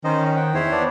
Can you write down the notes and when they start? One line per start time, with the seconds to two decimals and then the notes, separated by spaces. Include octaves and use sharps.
0.04 D#3 C#4 C5 D#5
0.24 D#5
0.36 F#5 G5
0.54 E2 E4 C5 C#5
0.72 B3 D4 D5